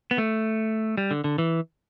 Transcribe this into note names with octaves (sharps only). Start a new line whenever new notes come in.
B3
A3
G3
D3
D3
E3